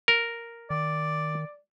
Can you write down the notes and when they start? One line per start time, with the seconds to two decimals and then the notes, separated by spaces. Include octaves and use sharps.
0.08 A#4
0.70 D#3 D5